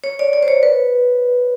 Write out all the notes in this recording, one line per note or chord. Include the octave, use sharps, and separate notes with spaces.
C#5
D5
D5
C5
C#5
B4